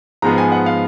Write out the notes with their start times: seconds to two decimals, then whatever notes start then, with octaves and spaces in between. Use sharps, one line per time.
0.22 G#2 F3 G#3 B3 A#5
0.38 G#5
0.52 F#5
0.66 F5